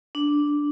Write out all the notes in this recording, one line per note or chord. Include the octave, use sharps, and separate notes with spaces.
D4